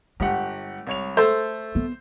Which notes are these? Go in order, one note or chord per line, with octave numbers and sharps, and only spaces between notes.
G1 G#3 G4 F#5
C2 C#5 F7
A3 A4 C5
B3